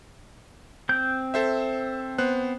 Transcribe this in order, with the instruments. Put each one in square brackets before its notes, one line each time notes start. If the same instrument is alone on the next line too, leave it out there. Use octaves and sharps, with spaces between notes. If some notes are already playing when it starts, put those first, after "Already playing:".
[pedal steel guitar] C4 G6
[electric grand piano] A4 C5 E5
B3 C5 F#6